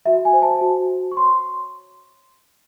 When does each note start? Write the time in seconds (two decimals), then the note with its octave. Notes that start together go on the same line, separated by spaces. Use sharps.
0.06 F#4 E5
0.25 G#5
0.33 C5
0.42 A5
0.61 F#4
0.88 C5
1.12 C#6
1.17 C#5 C6